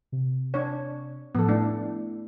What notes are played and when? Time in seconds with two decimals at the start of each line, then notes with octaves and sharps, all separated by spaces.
0.12 C3
0.54 D4 C#5
1.35 A2 F3 B3 A4
1.49 A3 D4 E4